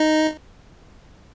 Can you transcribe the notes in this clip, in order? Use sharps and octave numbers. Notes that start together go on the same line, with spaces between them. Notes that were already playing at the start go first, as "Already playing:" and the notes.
Already playing: D#4